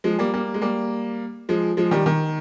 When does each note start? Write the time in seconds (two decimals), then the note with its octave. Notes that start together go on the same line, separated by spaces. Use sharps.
0.04 F3 G#3
0.19 G3 A#3
0.34 G3 A#3
0.54 G#3
0.62 G3 A#3
1.49 F3 G#3
1.77 F3 G#3
1.91 D#3 G3
2.06 D#3